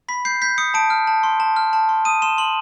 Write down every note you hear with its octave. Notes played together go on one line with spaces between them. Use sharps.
B5 B6
G6 C7
G6 B6
D#6 C#7
A5 D7
F6
A5
C6
A5
F6
A5
C6
D#6 D#7
C6 E7
C6 F#7